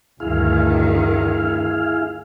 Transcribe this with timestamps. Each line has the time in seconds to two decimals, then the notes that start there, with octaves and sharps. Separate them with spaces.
0.20 D2 G2 D#3 E4 G#4 F5